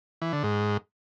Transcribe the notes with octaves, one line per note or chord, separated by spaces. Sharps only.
E3
D3
G#2